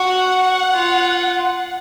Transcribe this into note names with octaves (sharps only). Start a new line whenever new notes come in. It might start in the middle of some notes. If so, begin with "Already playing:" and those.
Already playing: F#4 F#5
F4